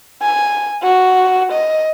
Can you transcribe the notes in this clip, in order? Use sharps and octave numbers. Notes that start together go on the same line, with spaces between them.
G#5
F#4
D#5